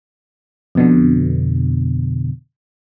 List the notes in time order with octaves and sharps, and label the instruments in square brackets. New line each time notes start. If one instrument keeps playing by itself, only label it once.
[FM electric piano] F2 B2 D3